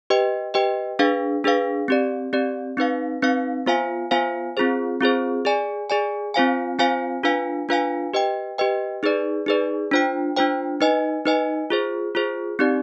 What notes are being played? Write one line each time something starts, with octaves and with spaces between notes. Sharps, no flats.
G4 B4 D#5 G5
G4 B4 D#5 G5
D4 G#4 B4 F5
D4 G#4 B4 F5
C4 G4 D5
C4 G4 D5
C4 D#4 B4 F5
C4 D#4 B4 F5
B3 F4 C5 F5 G#5
B3 F4 C5 F5 G#5
C4 F4 G#4 C5
C4 F4 G#4 C5
G#4 D5 G#5
G#4 D5 G#5
C4 F4 C5 F5 G#5
C4 F4 C5 F5 G#5
D4 F4 B4 F5 G#5
D4 F4 B4 F5 G#5
G4 B4 D#5 G5
G4 B4 D#5 G5
D#4 G#4 B4 D5
D#4 G#4 B4 D5
D4 F4 C5 G5
D4 F4 C5 G5
D#4 B4 D#5 G#5
D#4 B4 D#5 G#5
F4 G#4 C5
F4 G#4 C5
C4 D#4 G4 D5